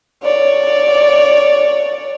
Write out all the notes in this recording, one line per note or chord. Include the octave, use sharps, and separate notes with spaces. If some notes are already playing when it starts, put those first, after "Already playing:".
C#5 D5